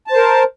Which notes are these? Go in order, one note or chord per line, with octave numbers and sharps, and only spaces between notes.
A#4 C5 A5